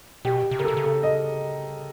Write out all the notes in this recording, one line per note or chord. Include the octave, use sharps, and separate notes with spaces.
B2 G4
C3
C#3 A#4
C3 A4
C#3
A4
D#5